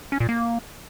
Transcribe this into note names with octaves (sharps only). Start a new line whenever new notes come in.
C#4
A#2
A#3